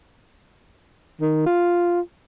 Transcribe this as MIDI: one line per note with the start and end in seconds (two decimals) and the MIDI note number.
1.21 1.42 51
1.46 2.00 65